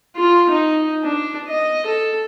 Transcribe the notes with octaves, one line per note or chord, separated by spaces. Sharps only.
F4
D#4
D4
D#5
A4